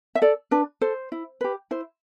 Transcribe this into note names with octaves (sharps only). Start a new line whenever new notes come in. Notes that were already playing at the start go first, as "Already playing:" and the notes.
E5
A4 D5
D4 B4
A4 C5
E4
G4 B4
E4 C5